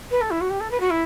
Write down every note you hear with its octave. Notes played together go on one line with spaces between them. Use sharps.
B4
A4
E4
F#4
G4
A4
B4
F#4
E4